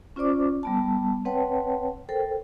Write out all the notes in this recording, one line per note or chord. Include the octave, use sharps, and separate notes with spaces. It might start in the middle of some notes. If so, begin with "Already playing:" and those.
C#4 F4 C5 D5 D6
G3 B3 A5
C4 B4 C#5 F#5 G5 A5
A4 A#4 C5 G5